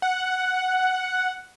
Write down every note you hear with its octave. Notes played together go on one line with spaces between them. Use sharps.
F#5